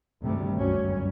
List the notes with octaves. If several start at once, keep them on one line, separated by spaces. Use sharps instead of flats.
D2 G2 C3 D#3 G3 A3
G1 C#2 F#2 F#3 G3 C#4